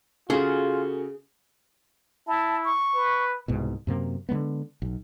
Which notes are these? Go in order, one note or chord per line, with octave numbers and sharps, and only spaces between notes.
C#3 F4 F#4 G#4 A4
E4 A5
C#6
B4
C2 G#2 B2
F#2 C3 A#3
D3 F#3 G#3 B3
B1